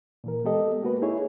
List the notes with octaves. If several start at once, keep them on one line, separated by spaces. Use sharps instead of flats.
A#2 E3 A#4
G#3 B3 G4 A4 D#5
A#3 F#4 B4
D#4 E4 G#4 C#5